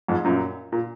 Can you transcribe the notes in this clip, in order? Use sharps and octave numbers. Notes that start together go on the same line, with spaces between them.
F2 G#2
F#2 A#2
A#2